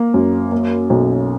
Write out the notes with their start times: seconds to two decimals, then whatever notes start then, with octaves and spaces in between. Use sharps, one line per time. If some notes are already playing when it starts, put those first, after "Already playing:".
Already playing: A#3
0.14 F#2
0.52 A#3
0.90 B1